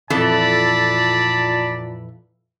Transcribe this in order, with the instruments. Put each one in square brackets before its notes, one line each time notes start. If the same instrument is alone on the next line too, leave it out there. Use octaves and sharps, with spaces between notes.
[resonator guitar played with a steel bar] F2 E3 A4 [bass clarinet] A#2 [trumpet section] D5 A5 B5